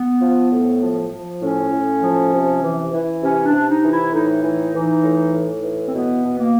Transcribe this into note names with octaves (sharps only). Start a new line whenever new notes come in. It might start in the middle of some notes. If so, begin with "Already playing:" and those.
Already playing: B3
F3
A2
F3
F3
A2 C#4
A2
F3
C3
E3
E3
C3 C#4
D4
C3
D#4
E3
E4
A2 D#4
E3
E3
A2
A2
E3
C4
B2 B3
B2
A#3